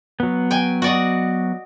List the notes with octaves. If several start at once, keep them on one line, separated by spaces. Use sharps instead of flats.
F#3 B3
G5 G#5
F#4 D5 D#5